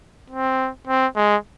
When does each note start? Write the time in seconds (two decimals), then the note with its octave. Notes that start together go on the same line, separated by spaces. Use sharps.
0.30 C4
0.87 C4
1.16 G#3